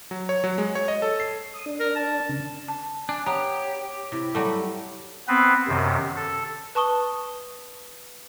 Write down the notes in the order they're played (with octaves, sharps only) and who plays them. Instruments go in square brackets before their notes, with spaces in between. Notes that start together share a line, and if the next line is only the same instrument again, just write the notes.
[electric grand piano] F#3
C#5
F#3
G#3
C#5
D#5
A4
C7
[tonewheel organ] D#6
D4
[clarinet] A#4
A5
[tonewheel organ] C#3
[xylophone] A5
[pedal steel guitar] D4 [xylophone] G#5
[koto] B3 [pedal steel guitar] G4 [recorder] C#5 [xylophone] A#5
[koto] C3 [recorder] E4
[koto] F#3 G3 A3 [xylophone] A4
[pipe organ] B3 C4 B4
F#2 C3 D#3
A4
[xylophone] B4 A5 C#6 D#6 G7